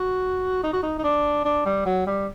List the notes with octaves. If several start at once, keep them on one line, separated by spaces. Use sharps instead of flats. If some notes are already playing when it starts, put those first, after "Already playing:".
Already playing: F#4
D#4
F#4
D#4
D#4
D4
D4
G3
F#3
G3